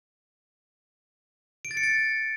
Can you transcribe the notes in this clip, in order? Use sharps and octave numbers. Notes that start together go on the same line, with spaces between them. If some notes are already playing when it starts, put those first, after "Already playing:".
D7
A6
C#7
A6